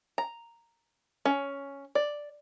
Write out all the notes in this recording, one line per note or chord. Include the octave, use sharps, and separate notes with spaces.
A#5
C#4
D5